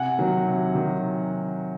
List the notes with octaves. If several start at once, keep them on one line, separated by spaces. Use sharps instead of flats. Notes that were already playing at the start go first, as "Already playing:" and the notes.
Already playing: C3 F#5 G#5
D#3 F#3
C3
D#3 F#3